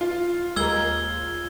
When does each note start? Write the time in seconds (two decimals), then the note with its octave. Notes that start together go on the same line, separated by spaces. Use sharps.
0.01 F4
0.56 D#2 G#3 A#4 E6 G#6 G7